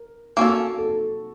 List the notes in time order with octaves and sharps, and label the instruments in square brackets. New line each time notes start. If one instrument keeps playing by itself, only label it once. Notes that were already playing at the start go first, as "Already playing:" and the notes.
Already playing: [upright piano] A#4
[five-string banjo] A#3 C#4 A4 [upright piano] F#4
[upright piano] A4